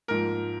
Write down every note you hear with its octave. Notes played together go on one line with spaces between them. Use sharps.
G#2 F3 A#3 A#4